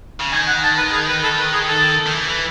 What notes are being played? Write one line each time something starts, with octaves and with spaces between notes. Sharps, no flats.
C#3
D#3 G#5
F#5
A5
B4
G#4
B4
A4
B4
G#4
A4
D#3
E3
E3